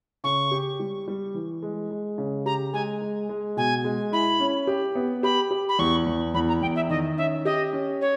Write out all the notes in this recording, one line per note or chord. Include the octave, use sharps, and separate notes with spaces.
C#3 C#6
G4
G3
G3
E3
G#3
G#3
C#3
G4 A#5
G#3 G#5
G#3
G#3
B2 G#5
G#3
E4 B5
C#4
G4
B3
G4 B5
G4
B5
E2 C#6
E2
E2 B5
A#5
E2 G5
E5
D#3 D#5
C#4 E5
G4 D#5
C#4
C#5